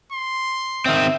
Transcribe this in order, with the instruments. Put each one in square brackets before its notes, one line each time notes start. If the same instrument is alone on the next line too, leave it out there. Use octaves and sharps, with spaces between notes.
[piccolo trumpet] C6
[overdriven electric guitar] D#3 C4 [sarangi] E5